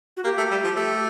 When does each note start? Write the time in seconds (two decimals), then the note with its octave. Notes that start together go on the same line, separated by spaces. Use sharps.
0.17 F#4
0.24 A#3 G4
0.38 A3
0.51 G3
0.64 F3
0.76 A3 G4